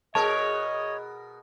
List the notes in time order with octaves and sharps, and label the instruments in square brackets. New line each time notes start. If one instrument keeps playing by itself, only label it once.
[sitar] B2 G#4 A#4 [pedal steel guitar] C#5 [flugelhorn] D#5 [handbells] A5